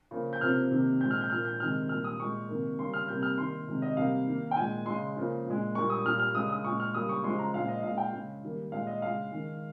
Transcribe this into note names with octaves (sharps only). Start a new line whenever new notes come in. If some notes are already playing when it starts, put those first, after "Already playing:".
C#3 F3 A#3
G6
C3 F3 A#3 F6
C3 D#3 A#3
A#2 F3 G#3 G6
F6
G6
A#2 F3 A#3 F6
G6
C3 D#3 G#3 F6
A#2 G3 A#3 F6
D#6
A#2 G#3 C#6
C3 D#3 A#3
C#3 G3 A#3 C6
F6
C3 G3 A#3 G6
F6
D#3 A#3 C6
C3 D#3 G#3
D#5
C3 G3 A#3 F5
D#3 A#3
G5
A#2 G#3 G#5
C#3 G#3 C6
C#3 F3 A#3
A#2 G#3
A#2 G3 A#3 C#6
D#6
A#2 G3 A#3 F6
F6
C#3 G#3 D#6
D#6
A#2 G#3 C#6
F6
C#3 G3 A#3 D#6
C#6
C#3 F3 G#3 C6
A#5
A#2 F3 G#3 F5
D#5
A#2 G#3 F5
G5
C#3 G#3
D#3 G3 A#3
A#2 G#3 F5
D#5
C#3 G#3 F5
D#3 G#3